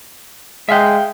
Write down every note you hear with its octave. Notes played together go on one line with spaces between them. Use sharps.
G#3 E5 F5 G5